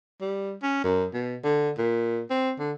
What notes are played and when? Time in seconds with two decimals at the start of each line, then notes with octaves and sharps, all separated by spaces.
0.21 G3
0.63 C#4
0.84 F#2
1.14 B2
1.44 D3
1.78 A#2
2.30 C4
2.59 D3